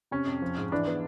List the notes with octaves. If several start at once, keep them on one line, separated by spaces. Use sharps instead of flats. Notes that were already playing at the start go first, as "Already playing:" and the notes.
C3 C#4
F2
F3
G#2
E3 D4
B3